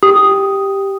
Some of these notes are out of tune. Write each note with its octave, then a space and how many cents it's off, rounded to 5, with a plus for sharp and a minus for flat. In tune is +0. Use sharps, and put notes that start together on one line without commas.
G4 +0 D#6 +0